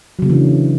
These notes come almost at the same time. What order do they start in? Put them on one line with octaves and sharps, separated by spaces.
F#3 C#3 A#3 E3 D4